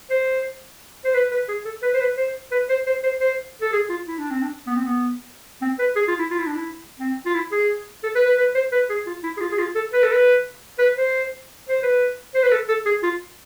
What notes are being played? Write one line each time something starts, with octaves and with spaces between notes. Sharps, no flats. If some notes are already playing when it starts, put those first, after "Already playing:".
C5
C5
B4
B4
G#4
A4
B4
C5
B4
C5
B4
C5
C5
C5
C5
A4
G#4
F4
E4
D4
C4
D4
B3
C4
B3
C4
B4
G#4
F4
E4
F4
E4
D4
E4
C4
F4
E4
G#4
A4
B4
B4
B4
C5
B4
G#4
F4
E4
G#4
F4
G#4
F4
A4
B4
A4
B4
B4
C5
C5
B4
C5
B4
A4
A4
G#4
F4